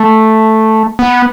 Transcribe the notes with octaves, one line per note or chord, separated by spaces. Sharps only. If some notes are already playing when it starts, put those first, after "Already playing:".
Already playing: A3
B3